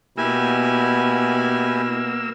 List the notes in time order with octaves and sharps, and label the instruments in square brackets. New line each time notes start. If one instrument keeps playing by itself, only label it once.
[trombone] B2 [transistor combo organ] A#3 E6 [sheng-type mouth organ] E4 G4 G#5